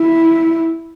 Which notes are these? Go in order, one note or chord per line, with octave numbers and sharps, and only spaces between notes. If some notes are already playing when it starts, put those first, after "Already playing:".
Already playing: E4